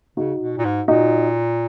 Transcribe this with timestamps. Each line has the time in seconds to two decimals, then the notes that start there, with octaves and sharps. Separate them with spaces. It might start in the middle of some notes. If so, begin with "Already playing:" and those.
0.17 C#3 D#4 F#4
0.41 B2
0.58 A#2
0.65 G#2
0.88 A#2 D#4 F#4